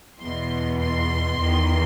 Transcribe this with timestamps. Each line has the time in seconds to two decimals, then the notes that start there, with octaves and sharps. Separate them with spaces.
0.19 E2 B2 C6
0.79 C6
1.38 E2 D#3